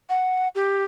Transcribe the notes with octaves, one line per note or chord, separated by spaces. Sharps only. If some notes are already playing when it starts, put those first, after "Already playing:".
F#5
G4